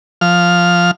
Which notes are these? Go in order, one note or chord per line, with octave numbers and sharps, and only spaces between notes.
F3 F6